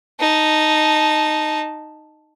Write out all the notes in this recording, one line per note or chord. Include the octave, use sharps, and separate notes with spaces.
D#4 A5